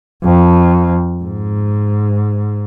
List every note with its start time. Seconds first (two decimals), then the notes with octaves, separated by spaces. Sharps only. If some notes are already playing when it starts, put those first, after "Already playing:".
0.24 F2
1.23 G#2